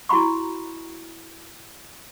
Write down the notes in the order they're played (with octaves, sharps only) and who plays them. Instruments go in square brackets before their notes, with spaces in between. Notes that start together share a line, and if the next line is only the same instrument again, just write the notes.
[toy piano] E4 F#4 A#5 B5 C#6